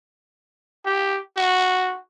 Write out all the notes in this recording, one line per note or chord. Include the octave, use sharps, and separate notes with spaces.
G4
F#4